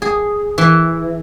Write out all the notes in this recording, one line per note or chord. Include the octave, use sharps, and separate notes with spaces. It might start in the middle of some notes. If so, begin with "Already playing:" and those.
G#4
E3